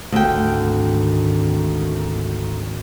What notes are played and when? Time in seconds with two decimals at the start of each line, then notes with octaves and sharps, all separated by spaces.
0.12 G#1 D2 D#3 G5